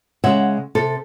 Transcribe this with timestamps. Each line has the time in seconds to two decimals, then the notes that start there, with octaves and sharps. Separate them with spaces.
0.24 C#3 G#3 E5 F#5
0.75 C3 A4